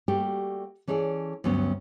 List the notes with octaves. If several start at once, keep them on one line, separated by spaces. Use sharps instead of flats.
G3 A3 A#3 F#4 G4
E3 C#4 G#4 A4 D5
D2 G2 F#3 B3 C#4